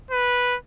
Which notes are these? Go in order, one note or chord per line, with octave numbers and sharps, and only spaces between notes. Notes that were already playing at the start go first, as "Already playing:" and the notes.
B4